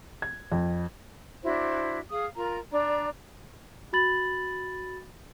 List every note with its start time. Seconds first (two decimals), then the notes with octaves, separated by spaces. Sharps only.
0.22 G#6
0.52 F2
1.43 D4 E4 F#4 C5
2.11 G#4 F5 D#6
2.36 F4 A#4 A#5
2.72 D4 D5 A#5
3.93 F#4 B5 A6 F#7